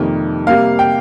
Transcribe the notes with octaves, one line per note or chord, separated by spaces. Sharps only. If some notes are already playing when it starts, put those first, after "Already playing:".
Already playing: F2 C3 D#3 G3 A#3
C3 G3 A#3 F5
G5